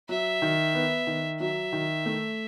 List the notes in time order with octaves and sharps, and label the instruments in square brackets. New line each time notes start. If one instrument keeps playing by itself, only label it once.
[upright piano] F#3 [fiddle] E5
[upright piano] D#3
B3
D#3
[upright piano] F#3 [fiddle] E5
[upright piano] D#3
A3